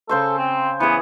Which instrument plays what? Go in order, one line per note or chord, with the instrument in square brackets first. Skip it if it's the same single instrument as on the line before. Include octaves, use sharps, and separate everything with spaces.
[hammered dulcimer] C#3 C5 C#6 [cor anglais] A4
[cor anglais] C4
[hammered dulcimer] E3 G#4 [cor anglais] B3